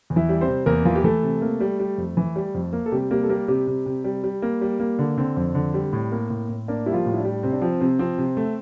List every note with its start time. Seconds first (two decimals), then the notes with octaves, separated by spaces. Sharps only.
0.10 E2
0.16 E3 E4
0.29 G3
0.41 C4 C5
0.48 C3
0.66 E2 A#3 A#4
0.85 E3 F4
0.95 G4
1.04 E3 A3 A4
1.23 C3
1.42 A#3
1.60 G3
1.79 G3
1.98 F2
2.17 E3
2.36 G3
2.54 F2
2.73 A#3
2.86 A4
2.92 C3 G3 G4
3.11 G3 A#3 G4
3.23 A4
3.29 G3 A#3 A#4
3.48 C3 G3 G4
3.67 C3
3.86 C3
4.04 G3
4.24 G3
4.42 A#3
4.61 G3
4.80 A#3
4.99 D3
5.18 D3 C4
5.37 F2
5.55 D3
5.74 G3
5.93 A2
6.12 A#3
6.30 A2
6.49 A2
6.68 A#3 D4
6.86 G3 E4
6.93 F3 F4
7.06 A2
7.14 E4
7.18 D4
7.24 G3
7.43 C3 C4
7.52 D4
7.62 F3 C4
7.80 C3 C4
7.99 F3 C4
8.18 C3
8.37 A3